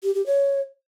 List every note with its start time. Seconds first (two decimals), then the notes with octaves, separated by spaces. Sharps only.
0.03 G4
0.15 G4
0.26 C#5